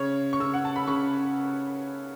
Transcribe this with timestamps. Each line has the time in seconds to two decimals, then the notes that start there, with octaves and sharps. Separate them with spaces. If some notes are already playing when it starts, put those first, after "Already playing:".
Already playing: C#3 C#5
0.33 C#6
0.40 C#3 E6
0.54 F#5
0.65 A5
0.76 B5
0.87 C#3 C#6